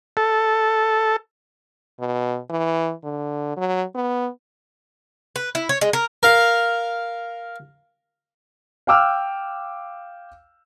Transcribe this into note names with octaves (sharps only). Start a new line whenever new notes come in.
A4
B2
E3
D3
F#3
B3
B4
E4
C#5
G#3
A#4
A#4 F5
F5 G5 D6 E6 F6